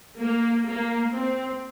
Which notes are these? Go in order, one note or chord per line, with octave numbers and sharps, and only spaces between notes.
A#3
A#3
C4